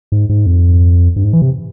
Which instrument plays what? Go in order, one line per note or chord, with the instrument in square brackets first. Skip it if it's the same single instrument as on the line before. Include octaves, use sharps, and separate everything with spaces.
[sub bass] G#2
G#2
F2
G2
G#2
E3
C3